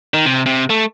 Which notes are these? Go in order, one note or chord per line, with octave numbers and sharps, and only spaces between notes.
D#3
C3
C3
A3